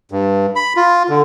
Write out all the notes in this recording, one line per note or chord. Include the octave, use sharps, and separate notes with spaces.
G2
B5
F4
D3